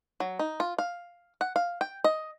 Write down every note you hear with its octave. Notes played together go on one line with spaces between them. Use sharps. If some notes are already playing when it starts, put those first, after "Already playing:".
F#3
D#4
F4
F5
F#5
F5
G5
D#5